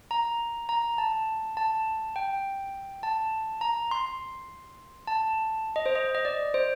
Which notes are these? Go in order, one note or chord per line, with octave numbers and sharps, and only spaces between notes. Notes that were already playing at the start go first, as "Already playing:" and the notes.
A#5
A#5
A5
A5
G5
A5
A#5
C6
A5
D#5
C5
D#5
D#5
D5
C5